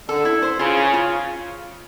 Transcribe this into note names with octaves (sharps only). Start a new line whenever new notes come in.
D3 A4
E4
C5
C#3 F4
C#5
F4